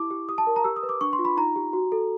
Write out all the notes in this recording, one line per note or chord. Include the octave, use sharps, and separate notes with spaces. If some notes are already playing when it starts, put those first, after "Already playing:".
Already playing: E4 G4 D6
G4
G4 D#6
A5
A#4
A#5
G4 E6
D#6
B4
D6
D4 C#6
C6
F4
B5
D#4 A#5
G4
F#4
A4